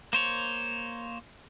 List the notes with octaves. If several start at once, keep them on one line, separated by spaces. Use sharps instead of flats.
A#3 C5 C#5